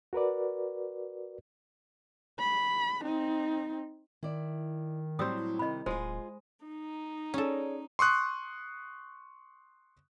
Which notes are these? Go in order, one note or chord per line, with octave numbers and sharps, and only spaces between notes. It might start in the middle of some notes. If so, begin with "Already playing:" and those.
F#4 A#4 B4 D5
B5
C4 D#4
D#3 E4 D5
A2 F#3 G3 C4 C5 D#6 E6
C3 D#3 D#5 B5
D1 G#3 F4 G#4 C5
D#4
C#4 G#4 A4 C#5 D5
C6 C#6 D#6 F#6